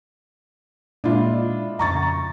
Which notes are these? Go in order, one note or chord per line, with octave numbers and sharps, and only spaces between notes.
A#2 G#3 D4 E4 F4 D#5
F2 C#3 A#5 C#6 A6